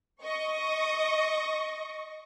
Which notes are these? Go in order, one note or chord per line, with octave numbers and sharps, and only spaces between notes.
D#5 C#6